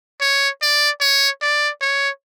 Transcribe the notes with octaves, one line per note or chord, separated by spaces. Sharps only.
C#5
D5
C#5
D5
C#5